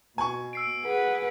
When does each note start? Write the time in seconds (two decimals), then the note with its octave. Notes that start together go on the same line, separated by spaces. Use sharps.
0.18 B2 G#5 C#6
0.53 E6 C7 D7
0.85 G#4 B4 F#5